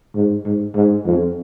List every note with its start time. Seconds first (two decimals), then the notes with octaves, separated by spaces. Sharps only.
0.15 G#2
0.45 G#2
0.75 G#2
1.05 F2